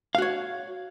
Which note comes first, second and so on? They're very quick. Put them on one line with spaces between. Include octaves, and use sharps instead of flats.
F5 F#4 C#5